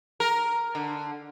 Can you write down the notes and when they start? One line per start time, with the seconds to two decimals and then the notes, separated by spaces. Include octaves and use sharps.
0.20 A#4
0.75 D3